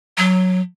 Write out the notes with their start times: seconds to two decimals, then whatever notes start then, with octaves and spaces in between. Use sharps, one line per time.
0.18 F#3